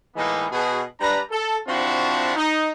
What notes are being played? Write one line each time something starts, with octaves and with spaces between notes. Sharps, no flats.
A2 E3 G#3 A#3 B3 D#4
B2 F#4 G#4
G3 D4 B4 A#5
A4
F3 C4 D4 E4 F#4
D#4